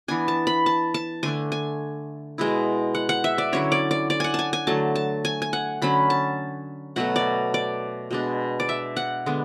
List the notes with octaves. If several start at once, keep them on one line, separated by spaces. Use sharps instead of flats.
E3 B3 D4 G#5
A5
B5
A5
A5
D3 A3 D4 G#5
G#5
B2 G#3 B3 E4
F#5
F#5
E5
D5
D3 F#3 C#4 E4 C#5
D5
D5
D5
F#5 G#5
G#5 A5
G#5
D3 F#3 A3 A5
A5
G#5
G#5
F#5
D3 F#3 C#4 B5
A5
B2 F#3 A3 F#5
D5
D5
B2 G#3 D4
D5
E5
F#5
D3 G#3 B3 D4